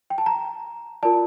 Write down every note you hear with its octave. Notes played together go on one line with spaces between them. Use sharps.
G5
A5
A#5
F4 A#4 D5 A5